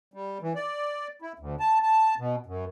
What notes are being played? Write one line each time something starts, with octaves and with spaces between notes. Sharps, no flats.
G3
E3
D5
E4
D2
A5
A5
B2
F#2